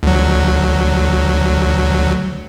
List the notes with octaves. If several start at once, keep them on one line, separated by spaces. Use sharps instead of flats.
D2 F#3